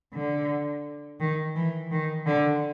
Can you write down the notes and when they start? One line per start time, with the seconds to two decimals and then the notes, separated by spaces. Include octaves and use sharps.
0.14 D3
1.20 D#3
1.56 E3
1.91 D#3
2.26 D3